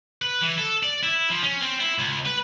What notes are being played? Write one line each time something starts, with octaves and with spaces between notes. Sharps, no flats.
B4
E3
A4
D5
E4
F3
C#4
C4
E4
C#2
B4